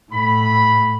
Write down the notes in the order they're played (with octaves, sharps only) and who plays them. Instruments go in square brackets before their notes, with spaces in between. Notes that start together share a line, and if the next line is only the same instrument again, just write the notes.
[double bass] A2 [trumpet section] B5